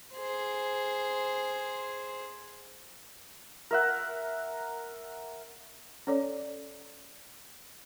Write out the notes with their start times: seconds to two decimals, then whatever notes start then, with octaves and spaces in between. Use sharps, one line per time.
0.14 G#4 C5
3.71 A#4 E5 F#5
6.07 C#4 A4 C#5 D5